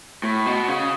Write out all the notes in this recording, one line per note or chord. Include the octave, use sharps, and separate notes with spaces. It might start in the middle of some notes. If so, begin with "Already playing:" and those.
A2
B2
C#3